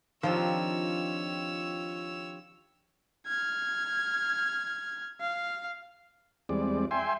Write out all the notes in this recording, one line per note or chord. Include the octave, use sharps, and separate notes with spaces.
D#3 F3 C4 D4 F4 G4 C#5 E6
F6 G#6
F5
E2 G3 G#3 C4 D5
E5 G5 G#5 C6